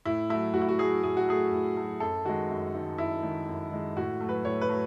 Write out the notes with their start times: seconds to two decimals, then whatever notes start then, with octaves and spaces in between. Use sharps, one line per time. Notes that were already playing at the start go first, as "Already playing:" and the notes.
0.05 A2 E4
0.30 F#3 A3 E4
0.53 A2 F#4
0.61 E4
0.69 F#4
0.79 F#3 A3 G#4
1.03 A2 G#4
1.17 F#4
1.27 F#3 A3 G#4
1.52 A2
1.77 F#3 A3
2.00 F#2 A4
2.25 D#3 G#3 F#4
2.50 F#2
2.74 D#3 G#3
2.98 F#2 E4
3.23 D#3 G#3
3.48 F#2
3.72 D#3 G#3
3.97 A2 F#4
4.21 F#3 A3
4.29 B4
4.45 A2 C#5
4.61 B4
4.69 F#3 A3